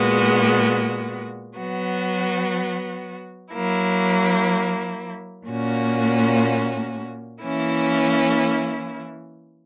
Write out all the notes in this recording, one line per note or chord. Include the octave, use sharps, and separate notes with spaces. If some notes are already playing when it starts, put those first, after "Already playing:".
Already playing: A#2 G#3 B3 F#4
F#3 B3 F#4
F#3 A#3 E4
A#2 A#3 C#4 F#4
E3 A#3 C#4 E4